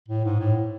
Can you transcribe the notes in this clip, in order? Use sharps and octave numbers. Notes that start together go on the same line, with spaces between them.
A2
G#2
A2